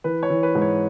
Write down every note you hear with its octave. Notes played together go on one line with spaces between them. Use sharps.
E3 B4
C#5
E3
B4
G#2
C#5